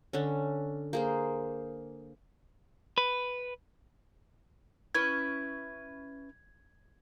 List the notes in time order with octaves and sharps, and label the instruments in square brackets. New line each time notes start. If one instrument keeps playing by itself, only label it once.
[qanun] D3 C#4
A#3 G#4 C5
[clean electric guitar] B4
[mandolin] C#4 E4 B4 [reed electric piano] G#6